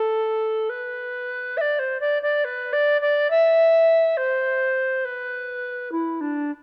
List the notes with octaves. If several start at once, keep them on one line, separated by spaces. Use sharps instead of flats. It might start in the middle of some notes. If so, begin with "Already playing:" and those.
Already playing: A4
B4
E5
D5
C5
D5
D5
B4
D5
D5
E5
C5
B4
E4
D4